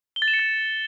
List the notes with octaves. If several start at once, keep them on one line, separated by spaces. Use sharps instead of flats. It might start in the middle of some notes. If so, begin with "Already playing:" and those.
G7
A6
E7
C#7
A6